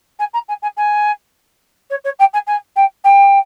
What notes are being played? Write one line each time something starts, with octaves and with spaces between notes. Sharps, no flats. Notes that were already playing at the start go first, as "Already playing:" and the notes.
G#5
A#5
G#5
G#5
G#5
C#5
C#5
G5
G#5
G#5
G5
G5